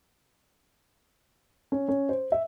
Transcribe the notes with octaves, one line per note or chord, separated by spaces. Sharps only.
C#4
C#4
C5
E5